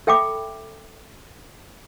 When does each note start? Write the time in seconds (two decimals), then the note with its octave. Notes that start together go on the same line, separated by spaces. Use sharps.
0.07 A4 E5 G5 B5 D6